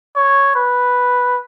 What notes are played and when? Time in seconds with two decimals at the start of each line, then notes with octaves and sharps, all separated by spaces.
0.16 C#5
0.56 B4